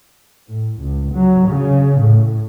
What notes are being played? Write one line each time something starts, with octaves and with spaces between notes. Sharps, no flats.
A2
C#2
F#3
C#3
A2